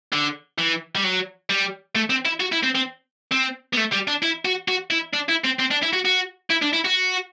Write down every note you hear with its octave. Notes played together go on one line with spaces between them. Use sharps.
D3
E3
G3
F#3
G3
A3
C4
E4
F#4
E4
C4
C4
C4
B3
A3
G3
D4
E4
F#4
F#4
E4
D4
E4
C4
C4
D4
E4
F#4
F#4
E4
D4
E4
F#4